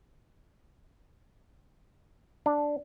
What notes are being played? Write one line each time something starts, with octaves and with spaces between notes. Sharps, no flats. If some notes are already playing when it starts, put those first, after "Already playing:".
D4